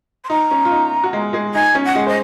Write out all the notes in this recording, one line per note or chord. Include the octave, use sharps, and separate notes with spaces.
C6
D#4 A#5
C#4
F4
D#4
F#4
G#3 G#4
G#3 G#4
D#4 G#5
C#4
F#5
G#3 G#4
C5 D#5